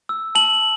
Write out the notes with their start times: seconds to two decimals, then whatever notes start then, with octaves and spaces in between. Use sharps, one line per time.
0.09 E6
0.35 A5 F#7